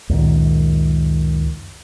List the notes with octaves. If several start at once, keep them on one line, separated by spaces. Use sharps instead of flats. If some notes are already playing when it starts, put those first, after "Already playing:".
C#2 F#2 A#2 D#3